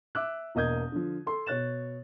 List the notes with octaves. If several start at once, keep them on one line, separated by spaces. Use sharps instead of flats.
E5 D6 E6 F#6
E1 A#3 D#5 D#6 G6 G#6
D3 F3
A4 C6
B2 C#5 F#6 A6 E7